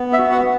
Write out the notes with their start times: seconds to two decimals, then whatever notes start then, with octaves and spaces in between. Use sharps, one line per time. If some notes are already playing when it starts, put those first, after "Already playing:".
Already playing: B3
0.13 E5
0.18 F#4
0.32 F#5